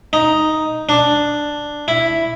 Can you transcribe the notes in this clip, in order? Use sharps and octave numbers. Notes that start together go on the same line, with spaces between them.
D#4
D4
E4